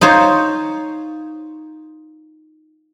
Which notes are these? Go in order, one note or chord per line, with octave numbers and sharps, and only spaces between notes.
D#4 F4 C5 C#5